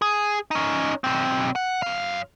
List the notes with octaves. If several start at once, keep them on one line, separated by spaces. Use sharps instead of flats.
G#4
C#4 D#4
B1 C4
F#5
F#2 F5